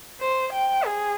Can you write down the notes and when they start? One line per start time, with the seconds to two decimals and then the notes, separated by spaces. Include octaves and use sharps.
0.21 C5
0.54 G5
0.84 G#4